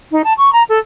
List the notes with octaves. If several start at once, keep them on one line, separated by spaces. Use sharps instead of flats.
D#4
A5
C#6
A#5
A4